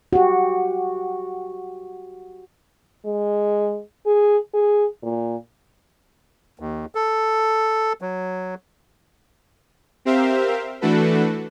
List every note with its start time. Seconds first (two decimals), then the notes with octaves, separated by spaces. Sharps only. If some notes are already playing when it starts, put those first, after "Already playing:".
0.13 F#4 G4
3.05 G#3
4.06 G#4
4.54 G#4
5.03 A#2
6.59 D#2
6.95 A4
8.01 F#3
10.05 C4 G4 A#4 C5 E5 F5
10.81 E3 A3 D4 F#4 A4 B4